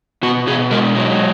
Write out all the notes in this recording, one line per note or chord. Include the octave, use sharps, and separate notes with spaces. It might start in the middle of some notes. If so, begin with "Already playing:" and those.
B2 F#4
B2 G#4
G#3 A#4
F#3